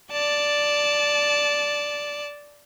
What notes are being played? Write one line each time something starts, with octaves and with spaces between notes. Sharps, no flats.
D5 A5